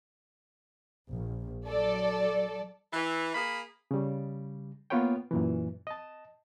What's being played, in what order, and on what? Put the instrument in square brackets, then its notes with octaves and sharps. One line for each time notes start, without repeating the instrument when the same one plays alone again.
[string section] A#1
F#3 A4 D5
[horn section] E3
A#3 G#4 B5
[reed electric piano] C#3 G3
A#3 B3 F4 B4 C#5 G5
F#2 A#2 E3
D#5 A5